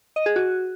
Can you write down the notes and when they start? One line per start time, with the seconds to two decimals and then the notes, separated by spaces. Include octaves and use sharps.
0.16 D#5
0.26 G#4
0.36 F#4